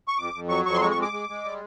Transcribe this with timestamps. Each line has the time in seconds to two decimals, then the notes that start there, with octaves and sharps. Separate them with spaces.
0.08 C#6
0.18 F2 D6
0.34 F2
0.49 F#3 C#6
0.65 F2 C#6
0.74 C6
0.81 G#3 C#6
0.91 C#6
0.97 G#3
1.02 D6
1.12 G#3
1.29 G#3
1.45 G3